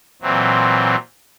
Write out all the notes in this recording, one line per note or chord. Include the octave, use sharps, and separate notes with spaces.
A#2 E3 F#3 C4